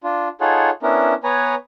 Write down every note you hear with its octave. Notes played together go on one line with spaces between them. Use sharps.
D4 F4
D#4 F4 G#4 A4 C#5 F#5
B3 C#4 D4 E4 A#4
B3 B4 C#5 G#5 A#5